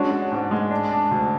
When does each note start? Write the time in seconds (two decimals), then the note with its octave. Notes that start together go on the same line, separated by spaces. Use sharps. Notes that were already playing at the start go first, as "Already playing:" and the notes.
Already playing: G#3 C#4 D4 F#4
0.12 F#4
0.32 G#2
0.51 G#3
0.71 D4
0.91 D4
1.11 D2